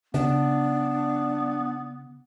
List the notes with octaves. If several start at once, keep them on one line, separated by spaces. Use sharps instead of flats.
C#3 B3 D4